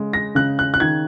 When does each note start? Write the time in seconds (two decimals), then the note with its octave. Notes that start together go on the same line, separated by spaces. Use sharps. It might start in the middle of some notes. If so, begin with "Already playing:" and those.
Already playing: C#3 G#3
0.13 A#6
0.35 C#3 F#6
0.59 F#6
0.74 F#6
0.80 D#3 G#6